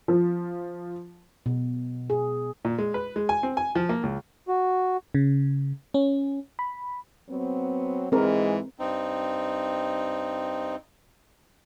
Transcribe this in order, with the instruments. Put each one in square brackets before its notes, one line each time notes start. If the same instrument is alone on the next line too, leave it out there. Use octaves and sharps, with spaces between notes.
[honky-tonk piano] F3
[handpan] B2
G#4
[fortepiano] A#2
G#3
B4
G#3
G#5
C4
G#5
F3
A#3
C#2
[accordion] F#4
[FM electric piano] C#3
C#4
B5
[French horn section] F#3 B3 C4
[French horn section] G#2 E3 G#3 [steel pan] C4 A#4
[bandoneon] G2 C4 D#4